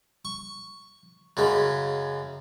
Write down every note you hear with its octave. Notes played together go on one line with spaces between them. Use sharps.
C#6
F#2 C#3 G#3